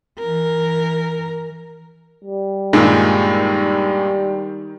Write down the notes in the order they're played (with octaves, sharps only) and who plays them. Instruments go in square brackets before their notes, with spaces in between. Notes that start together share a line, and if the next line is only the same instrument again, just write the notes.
[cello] E3 A#4
[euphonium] G3
[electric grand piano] G2 A#2 G#3 [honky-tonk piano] D#3